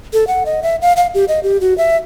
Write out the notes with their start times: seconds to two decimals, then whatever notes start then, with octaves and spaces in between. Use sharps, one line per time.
0.13 A4
0.27 F#5
0.46 D#5
0.63 E5
0.82 F5
0.97 F5
1.14 G4
1.28 D#5
1.43 G4
1.61 F#4
1.78 E5